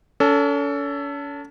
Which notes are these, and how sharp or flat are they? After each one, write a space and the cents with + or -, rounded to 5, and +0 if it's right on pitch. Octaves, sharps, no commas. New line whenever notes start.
C#4 +40 A4 +15